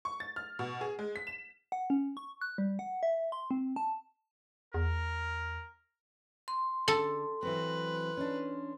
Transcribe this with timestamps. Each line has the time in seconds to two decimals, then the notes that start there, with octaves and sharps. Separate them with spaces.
0.05 C#6
0.20 A6
0.36 F6
0.59 B2
0.81 G#4
0.99 G#3
1.16 B6
1.27 E7
1.72 F#5
1.90 C#4
2.17 C#6
2.41 F#6
2.58 G3
2.79 F#5
3.03 E5
3.32 C6
3.51 C4
3.76 A5
4.74 E2 A#4
6.48 C6
6.88 D3 A4
7.43 E3 F#3 C4 B4
8.17 C#4 D4